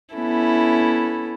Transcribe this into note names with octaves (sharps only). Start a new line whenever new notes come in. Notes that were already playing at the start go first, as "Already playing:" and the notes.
B3 C#4 E4 A4